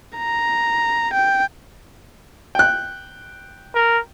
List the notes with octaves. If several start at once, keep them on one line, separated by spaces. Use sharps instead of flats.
A#5
G5
G5 F#6
A#4